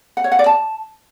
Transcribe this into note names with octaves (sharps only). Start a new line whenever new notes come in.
F#5
C#5
F#5
D5
A5